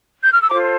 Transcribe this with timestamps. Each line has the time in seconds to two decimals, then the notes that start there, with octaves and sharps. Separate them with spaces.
0.23 G6
0.31 F6
0.41 E6
0.50 F4 A4 C5 A#5 D6